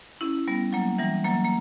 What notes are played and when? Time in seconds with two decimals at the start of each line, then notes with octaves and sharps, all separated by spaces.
0.21 C#4 E4
0.48 G3 B3
0.73 F#3 A#3
0.99 E3 G3
1.24 F#3 A#3
1.44 A#3